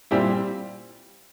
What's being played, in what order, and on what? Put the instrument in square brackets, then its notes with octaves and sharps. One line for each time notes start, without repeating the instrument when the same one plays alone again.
[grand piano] A#2 G3 C4 E4 G4